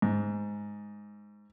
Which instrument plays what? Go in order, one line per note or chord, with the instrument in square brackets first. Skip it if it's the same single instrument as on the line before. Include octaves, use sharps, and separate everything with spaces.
[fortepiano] G#2